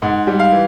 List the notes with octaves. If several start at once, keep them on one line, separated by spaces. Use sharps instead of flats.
G#2 F#5
G3
F5
E3